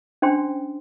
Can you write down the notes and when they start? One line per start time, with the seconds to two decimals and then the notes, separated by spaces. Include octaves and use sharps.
0.22 C#4 D4 C5 G5 C6